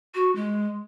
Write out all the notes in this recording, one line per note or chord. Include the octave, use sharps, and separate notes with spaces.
F#4
G#3